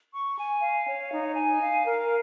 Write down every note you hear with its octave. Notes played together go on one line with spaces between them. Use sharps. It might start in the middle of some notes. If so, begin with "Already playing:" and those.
C#6
G#5
F5
C#5
D#4
G#5
F5
A#4